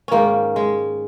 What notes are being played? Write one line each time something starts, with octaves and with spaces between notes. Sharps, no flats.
G#2 D#3 A#3 C#4
G#3